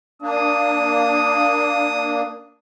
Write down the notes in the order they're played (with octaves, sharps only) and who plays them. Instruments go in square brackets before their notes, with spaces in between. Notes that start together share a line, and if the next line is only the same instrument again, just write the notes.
[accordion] A#3 D4 [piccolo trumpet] D#6